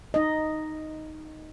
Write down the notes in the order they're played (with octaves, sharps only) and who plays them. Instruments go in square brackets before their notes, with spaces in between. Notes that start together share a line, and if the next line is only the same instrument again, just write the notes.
[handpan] D#4 D#5